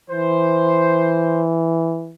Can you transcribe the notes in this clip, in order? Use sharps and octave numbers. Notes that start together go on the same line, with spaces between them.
E3 C5